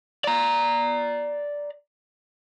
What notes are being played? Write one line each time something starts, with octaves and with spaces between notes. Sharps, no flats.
D5 A#5